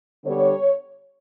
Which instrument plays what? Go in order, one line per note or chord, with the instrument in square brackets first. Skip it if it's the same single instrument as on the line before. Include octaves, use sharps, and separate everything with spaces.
[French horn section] D3 G3 B3 D4 C#5